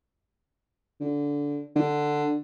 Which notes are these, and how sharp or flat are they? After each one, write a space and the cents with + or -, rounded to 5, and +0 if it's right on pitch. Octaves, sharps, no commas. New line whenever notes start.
D3 -20
D3 +10